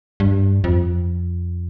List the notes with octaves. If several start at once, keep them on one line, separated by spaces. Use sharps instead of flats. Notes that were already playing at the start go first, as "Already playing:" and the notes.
G2
F2